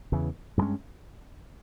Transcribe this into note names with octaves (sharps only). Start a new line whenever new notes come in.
E2 C#3 E3
G2 D#3 G#3 C#4